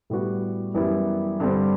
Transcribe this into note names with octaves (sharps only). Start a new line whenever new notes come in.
A2 G3 B3 F#4
F#2 E3 G3 B3 E4
G2 D3 G3 C4